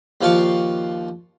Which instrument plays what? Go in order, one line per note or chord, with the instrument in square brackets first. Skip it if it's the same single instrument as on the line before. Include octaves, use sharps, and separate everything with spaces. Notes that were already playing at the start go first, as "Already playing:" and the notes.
[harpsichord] D#2 F3 D5 F5 C#6